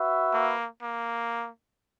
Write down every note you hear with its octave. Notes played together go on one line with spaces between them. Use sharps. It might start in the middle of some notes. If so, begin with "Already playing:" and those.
Already playing: F#4 B4 E5
A#3
A#3